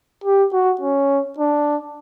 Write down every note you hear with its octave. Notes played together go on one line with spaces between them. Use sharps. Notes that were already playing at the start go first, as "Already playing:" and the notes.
G4
F#4
C#4
D4